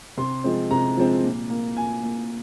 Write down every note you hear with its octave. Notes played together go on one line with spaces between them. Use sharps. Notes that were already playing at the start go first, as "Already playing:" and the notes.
C3 C6
F3 G#3 C4
C3 A#5
F3 G#3 C4
A#2
A#3
A#2 G#5
A#3